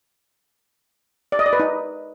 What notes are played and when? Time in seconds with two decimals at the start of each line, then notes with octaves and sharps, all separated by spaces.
1.32 D5
1.39 D#5
1.46 D5
1.53 B4
1.60 D#4